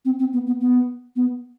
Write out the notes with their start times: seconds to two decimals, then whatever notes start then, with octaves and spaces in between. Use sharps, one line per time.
0.05 C4
0.19 C4
0.33 B3
0.46 B3
0.60 B3
1.16 B3